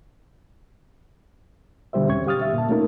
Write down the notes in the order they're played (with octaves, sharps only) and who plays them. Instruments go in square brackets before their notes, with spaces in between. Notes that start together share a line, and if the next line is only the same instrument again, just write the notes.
[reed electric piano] B2 D3 G3 G4 C5 E5
E2 C4 C#4 C#6 G#6
G4 F5 D#6 F6 A6
E5
A#2 A5
A3 A#3 C#4 D#4 F4 A#4